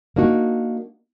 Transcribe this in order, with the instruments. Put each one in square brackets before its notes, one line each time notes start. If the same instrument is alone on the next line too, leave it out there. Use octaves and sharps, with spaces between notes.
[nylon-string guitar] A#3 D4 D#4 F#4